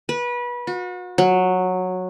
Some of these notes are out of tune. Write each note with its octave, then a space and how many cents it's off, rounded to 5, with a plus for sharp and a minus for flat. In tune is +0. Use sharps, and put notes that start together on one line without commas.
B4 -25
F#4 -40
F#3 -10